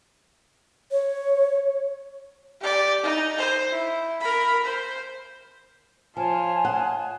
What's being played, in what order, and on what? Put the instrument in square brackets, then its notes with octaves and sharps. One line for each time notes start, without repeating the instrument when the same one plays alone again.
[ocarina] C#5
[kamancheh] G4 D5
D#4
C5
E4
A#4 B5
C5
[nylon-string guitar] F3 [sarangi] F4 [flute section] C#5 A5 [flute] G#5
[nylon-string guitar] D#5 F#5